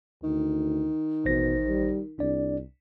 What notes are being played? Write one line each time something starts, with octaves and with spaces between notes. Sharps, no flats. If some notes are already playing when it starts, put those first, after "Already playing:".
D2 D#3
A1 B2 C5 A#6
G3
C2 D4 D5